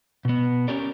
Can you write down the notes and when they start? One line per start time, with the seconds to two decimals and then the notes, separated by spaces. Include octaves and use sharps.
0.25 B2 B3
0.68 C#4 G4 A#4 C#5 D5